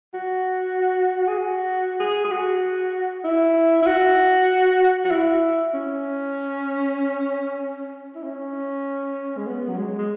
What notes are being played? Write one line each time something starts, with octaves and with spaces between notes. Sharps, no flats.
F#4
G#4
F#4
G#4
G#4
F#4
E4
E4
F#4
F#4
E4
C#4
E4
C#4
G#3
B3
F#3
G#3
G#3